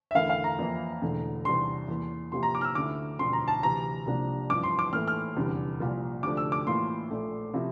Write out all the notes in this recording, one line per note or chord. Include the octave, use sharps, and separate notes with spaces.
E5
E2 D3 A3 E4 A#4 F5
F5
A#5
F2 E3 A#3 E4
E1 E2 D3 A3
E2 C3 G3 D4 C6
E2 E3 A#3
C3 F3 A#3 E4 G4 C6
A#5
D6
F6
E6
D2 D3 A3 E4 D6
E1 D2 D3 F3 C4 C6
A#5
A5
D2 C3 E3 A#5
C2 C3 F3 A#3 D4
A1 G2 F3 D6
C6
D6
A2 E3 A#3 E4 A4 F6
F6
F1 E2 D3 G3 C4
C2 A#2 F3 A#3 F4
D2 C3 F3 A3 D4 D6
E6
D6
A2 E3 A#3 F4 C6
A#1 A#2 A3
C3 F3 C4 E4